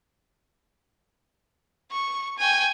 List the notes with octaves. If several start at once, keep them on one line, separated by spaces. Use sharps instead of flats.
C#6
G5 G#5